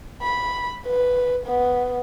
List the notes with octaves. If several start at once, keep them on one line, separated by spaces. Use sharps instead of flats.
B5
B4
B3